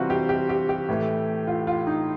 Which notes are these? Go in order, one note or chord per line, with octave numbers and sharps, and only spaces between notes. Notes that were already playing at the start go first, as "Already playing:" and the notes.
Already playing: C3 E3 G3 C4 F4 F#4
G4
G4
G4
G4
A2 E3 A3
F4
F4
D#4